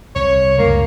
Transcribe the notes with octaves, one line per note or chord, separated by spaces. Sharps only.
C2 C#5
C#2 F#2 A2 A#3